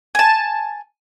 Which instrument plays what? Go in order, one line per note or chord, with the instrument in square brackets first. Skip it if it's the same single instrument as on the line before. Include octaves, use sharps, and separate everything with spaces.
[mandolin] G#5 A5